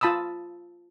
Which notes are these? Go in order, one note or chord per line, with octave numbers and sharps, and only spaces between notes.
F4 A5 B5 D#6 E6